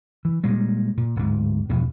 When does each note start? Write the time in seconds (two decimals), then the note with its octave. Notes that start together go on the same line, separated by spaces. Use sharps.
0.25 E3
0.44 A#2 G3 G#3
0.97 A#2
1.16 D1 G#2
1.70 E2 G2 B2 F3